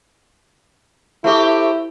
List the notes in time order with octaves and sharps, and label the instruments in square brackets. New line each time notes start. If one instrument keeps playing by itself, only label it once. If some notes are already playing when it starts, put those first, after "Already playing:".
[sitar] A3 C4 G4 [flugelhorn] E4